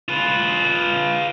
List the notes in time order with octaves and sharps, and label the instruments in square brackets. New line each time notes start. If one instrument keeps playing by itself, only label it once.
[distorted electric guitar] F4 B4